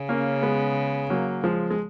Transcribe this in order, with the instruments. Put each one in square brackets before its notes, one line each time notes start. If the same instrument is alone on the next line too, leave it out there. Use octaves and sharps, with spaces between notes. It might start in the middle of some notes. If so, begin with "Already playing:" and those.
Already playing: [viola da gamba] C#3
[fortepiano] A#3 C#4
G#3 B3
F#3 A#3
F3 G#3
G#3